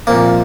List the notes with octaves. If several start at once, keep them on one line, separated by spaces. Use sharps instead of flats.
C2 A#2 F3 A#3 C4